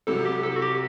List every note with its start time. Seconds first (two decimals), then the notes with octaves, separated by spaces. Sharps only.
0.07 C2 C3 F#3 A4
0.25 G4
0.43 A4
0.56 F#4
0.62 G4